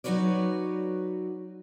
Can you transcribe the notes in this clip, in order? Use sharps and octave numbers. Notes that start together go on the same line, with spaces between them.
F#3 D#4 F#4 B4 C#5 D5